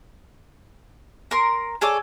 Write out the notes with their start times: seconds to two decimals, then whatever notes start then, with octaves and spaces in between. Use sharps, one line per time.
1.31 A#4 C6
1.81 G#4 A4 C#5 D5